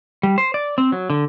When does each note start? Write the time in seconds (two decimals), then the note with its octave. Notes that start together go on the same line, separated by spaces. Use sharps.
0.23 G3
0.38 C5
0.54 D5
0.78 C4
0.92 F#3
1.10 D3